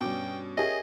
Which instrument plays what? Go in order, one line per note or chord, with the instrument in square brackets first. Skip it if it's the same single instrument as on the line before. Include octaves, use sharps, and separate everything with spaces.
[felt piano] G2 C#4 D6 [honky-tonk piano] B2 [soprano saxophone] G5
[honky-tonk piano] C#4 G#4 [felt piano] G4 A#4 E5 [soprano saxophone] D#5